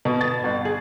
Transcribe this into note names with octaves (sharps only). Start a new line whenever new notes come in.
B2
A6
G1
G#4